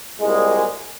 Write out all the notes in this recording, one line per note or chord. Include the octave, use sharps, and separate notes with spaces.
C2 A#2 G#3